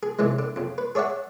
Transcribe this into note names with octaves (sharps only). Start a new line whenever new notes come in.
G#4
G#2 C3 E3 F#3 G#3
D3
F2 C#3
B4
G#4 C#5 D5 E5 F#5